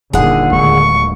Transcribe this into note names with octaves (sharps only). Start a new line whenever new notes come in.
D#1 D#2 A#2 D3 D#3 G#4 F#5
D1 D2 G#3 C#6